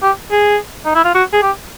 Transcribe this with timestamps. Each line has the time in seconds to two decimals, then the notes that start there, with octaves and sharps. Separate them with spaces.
0.03 G4
0.31 G#4
0.85 D#4
0.95 E4
1.05 F4
1.15 F#4
1.33 G#4
1.42 G4